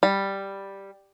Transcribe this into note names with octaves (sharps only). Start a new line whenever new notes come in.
G3